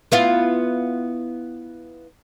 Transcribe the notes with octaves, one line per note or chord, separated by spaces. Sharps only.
B3 E4 F4